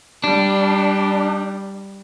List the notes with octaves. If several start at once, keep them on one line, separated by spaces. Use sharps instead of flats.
G3 D4